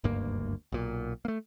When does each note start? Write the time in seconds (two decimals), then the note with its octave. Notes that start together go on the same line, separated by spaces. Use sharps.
0.04 F#1 D2 G2 A#3
0.72 B1 A#2
1.25 A3 A#3